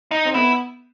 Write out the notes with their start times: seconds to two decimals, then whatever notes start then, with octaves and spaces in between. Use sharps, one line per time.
0.11 D#4
0.25 C4
0.34 B3 E4